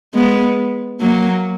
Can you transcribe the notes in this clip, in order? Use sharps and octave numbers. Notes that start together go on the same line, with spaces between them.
G#3 B3
F#3 A#3